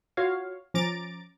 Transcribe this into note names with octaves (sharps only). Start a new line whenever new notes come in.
F4 F#4 C#5 F5
F3 C#4 A#5 D6 A6 D7